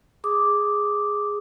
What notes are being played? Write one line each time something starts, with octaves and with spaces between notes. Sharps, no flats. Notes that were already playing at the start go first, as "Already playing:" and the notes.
G#4 D6 D#6